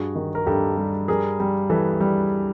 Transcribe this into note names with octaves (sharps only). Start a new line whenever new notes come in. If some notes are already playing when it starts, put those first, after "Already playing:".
Already playing: G2 F#4 G#4
D#3
A#4
G2 G4 A4
G3
G3 G#4 A#4
G3
E3 A4 B4
G3